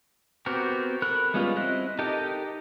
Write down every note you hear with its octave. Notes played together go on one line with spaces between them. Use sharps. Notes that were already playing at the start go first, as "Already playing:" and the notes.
B3 C4 F#4 G4 A#4
A4 A#4 B5 F#6
G3 G#3 B3 C#4 F4
C4 E4 D#5 F#6
D#4 G4 A4 A#4 D#5